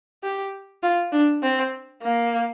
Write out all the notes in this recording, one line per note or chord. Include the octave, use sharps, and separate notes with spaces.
G4
F4
D4
C4
A#3